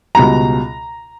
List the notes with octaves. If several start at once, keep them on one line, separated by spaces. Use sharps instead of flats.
C#2 B2 G3 A#5